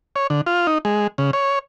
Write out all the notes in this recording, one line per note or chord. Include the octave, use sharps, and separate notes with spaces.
C#5
D3
F4
D#4
G#3
C#3
C#5